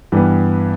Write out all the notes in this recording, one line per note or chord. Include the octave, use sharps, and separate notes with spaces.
G2 E3 G3 B3